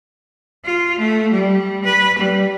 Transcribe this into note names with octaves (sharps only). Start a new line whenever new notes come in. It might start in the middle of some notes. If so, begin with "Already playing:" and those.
F4
A3
G3
B4
G3